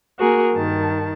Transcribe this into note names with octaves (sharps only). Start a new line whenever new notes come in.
A#3 F#4 G#4 A#4
G2 D#3 A5